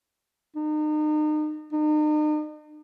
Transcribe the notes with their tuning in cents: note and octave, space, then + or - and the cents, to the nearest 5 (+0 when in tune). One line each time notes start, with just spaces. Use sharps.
D#4 -35
D#4 -40